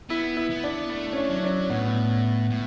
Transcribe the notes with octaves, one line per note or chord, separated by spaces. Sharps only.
B3 E4
E4
B3
D4
A3
C#4
D4
F#3
C#4
D4
A2 B3
A2